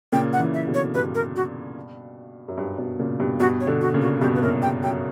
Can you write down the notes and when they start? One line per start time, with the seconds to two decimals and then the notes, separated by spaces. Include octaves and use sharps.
0.12 A#2 C#3 G5
0.33 F#5
0.39 C#3 E3
0.54 E5
0.68 B2 D3
0.74 C#5
0.94 G2 B2 B4
1.15 A#4
1.36 F#4
2.48 F#2
2.58 G2
2.78 G2 B2
2.99 A#2 C#3
3.20 G2 B2
3.40 G2 B2 F#4
3.60 C#5
3.67 B2 D3
3.81 F#4
3.94 A#2 C#3
4.01 F#4
4.21 G2 B2 G4
4.35 B4
4.42 F#2 A#2 A#4
4.62 G2 G5
4.83 F#2 G5